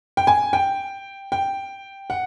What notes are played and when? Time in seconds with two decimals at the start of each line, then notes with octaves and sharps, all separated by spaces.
0.17 G5
0.27 G#5
0.53 G5
1.32 G5
2.10 F#5